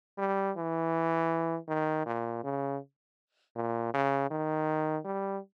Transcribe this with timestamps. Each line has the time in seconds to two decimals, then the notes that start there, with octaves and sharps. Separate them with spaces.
0.18 G3
0.57 E3
1.68 D#3
2.06 A#2
2.44 C#3
3.56 A#2
3.93 C#3
4.30 D#3
5.05 G3